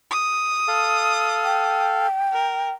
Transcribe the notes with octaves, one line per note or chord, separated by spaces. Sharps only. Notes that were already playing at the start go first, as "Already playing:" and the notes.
D#6
A4 F5
G5
A#4